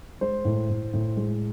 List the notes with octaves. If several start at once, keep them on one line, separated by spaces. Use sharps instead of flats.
G#3 C5
A2
A2
A2
G#3